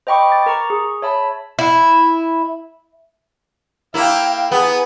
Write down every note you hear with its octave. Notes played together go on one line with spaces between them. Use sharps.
C5 D#5 G5 B5 C#6 D6
D6 A6
A#4 A#5 C#6
G#4
C#5 E5 A5 B5
E4
A#3 E4 F5 G5
B3 G#4